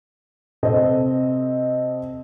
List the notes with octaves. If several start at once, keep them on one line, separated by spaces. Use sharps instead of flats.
C3 C4 A4 D#5